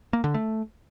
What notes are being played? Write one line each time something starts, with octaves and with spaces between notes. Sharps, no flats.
A#3
D3
A3